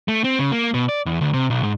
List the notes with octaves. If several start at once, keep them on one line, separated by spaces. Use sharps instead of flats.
A3
C4
C#3
A#3
B2
D5
E2
D2
C3
B1
G#2